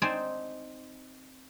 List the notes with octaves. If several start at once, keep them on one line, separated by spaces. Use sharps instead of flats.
C4 D#4 C5 D5 G#5 A5